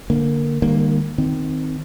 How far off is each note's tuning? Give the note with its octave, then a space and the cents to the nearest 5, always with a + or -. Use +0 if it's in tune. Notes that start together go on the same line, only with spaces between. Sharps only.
D3 +0 A#3 +0
D#3 -35 G3 +35 A#3 +0
D#3 +0 C4 -15